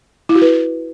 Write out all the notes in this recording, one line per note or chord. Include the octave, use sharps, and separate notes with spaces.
E4
F#4
B4